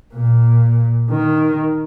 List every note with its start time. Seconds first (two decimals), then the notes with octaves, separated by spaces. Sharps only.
0.14 A#2
1.10 D#3